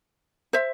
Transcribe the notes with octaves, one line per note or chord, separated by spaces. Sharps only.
C5 E5